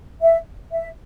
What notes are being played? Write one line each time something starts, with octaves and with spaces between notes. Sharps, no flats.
E5
E5